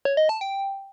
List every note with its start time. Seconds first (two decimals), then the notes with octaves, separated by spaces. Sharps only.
0.05 C#5
0.17 D#5
0.29 A5
0.41 G5